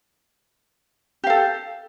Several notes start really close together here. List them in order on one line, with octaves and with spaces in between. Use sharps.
G4 F5 A4